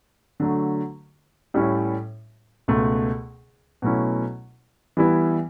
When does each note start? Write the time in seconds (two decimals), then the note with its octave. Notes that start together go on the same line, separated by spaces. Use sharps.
0.40 D3 F#3 A3
1.54 A2 G3 C#4 E4
2.68 C#2 B2 A3
3.82 B2 F#3 A3 C#4 E4
4.97 E3 G3 B3 E4